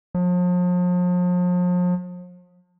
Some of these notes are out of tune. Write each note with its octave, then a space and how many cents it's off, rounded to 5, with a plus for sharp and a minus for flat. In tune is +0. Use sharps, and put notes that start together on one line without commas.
F3 +40